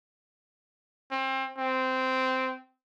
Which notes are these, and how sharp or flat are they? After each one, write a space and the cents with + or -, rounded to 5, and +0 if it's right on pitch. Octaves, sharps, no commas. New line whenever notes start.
C4 +25
C4 -10